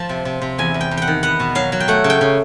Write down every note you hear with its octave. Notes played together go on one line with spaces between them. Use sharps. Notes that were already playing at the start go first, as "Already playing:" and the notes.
Already playing: F3 A5
C3
C3
C3
E2 G#5
E2
G5
E2
F#5 G5
D#3
B3 F#5
B2
F#3 F5
F#3
G5
A3 F#5
C#3
G5
C#3